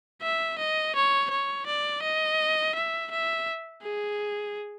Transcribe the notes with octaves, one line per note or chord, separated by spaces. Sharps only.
E5
D#5
C#5
C#5
D5
D#5
E5
E5
G#4